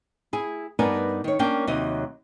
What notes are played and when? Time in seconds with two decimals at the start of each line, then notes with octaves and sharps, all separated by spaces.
0.33 E4 G#4
0.79 G2 B3 D#4 A#4 D5 G#5
1.24 D#3 C#5
1.39 A#3 C#4 D4 G5
1.67 D#2 C3 F#3 D#4 D#5